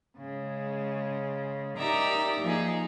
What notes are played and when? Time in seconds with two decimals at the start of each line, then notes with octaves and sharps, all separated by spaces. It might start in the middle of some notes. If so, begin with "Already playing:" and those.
0.17 C#3 G#3
1.77 D#4 G4 A#4 D5 E5 A#5
2.40 F3 A#3 D#4 G#4